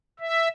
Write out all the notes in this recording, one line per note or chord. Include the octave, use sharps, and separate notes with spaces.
E5